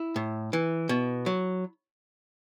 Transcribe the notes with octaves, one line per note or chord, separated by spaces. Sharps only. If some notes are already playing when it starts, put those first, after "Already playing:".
Already playing: E4
A2
E3
B2
F#3